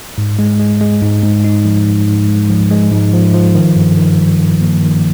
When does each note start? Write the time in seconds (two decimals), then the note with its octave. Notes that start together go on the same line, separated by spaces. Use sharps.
0.18 G#2
0.39 G#3
0.59 G#3
0.81 G#3
1.02 G#2
1.23 G#2
1.44 D#4
1.65 F3
1.86 F3
2.07 G#2
2.28 G#3
2.50 F3
2.71 G#3
2.92 G#2
3.14 F3
3.34 F3
3.55 D#3
3.76 G2
3.97 D#3
4.19 G3
4.40 D#3
4.61 A#3
4.82 D#3